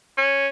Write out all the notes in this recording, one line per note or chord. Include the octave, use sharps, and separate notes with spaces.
C#4